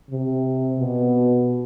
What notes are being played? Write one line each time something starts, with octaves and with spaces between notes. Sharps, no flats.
C3
B2